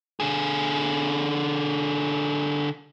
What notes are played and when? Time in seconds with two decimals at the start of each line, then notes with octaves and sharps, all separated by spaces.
0.20 D3 G#4